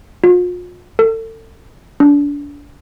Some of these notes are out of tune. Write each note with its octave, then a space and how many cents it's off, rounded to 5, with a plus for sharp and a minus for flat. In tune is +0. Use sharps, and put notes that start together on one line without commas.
F4 +40
A4 +35
D4 -30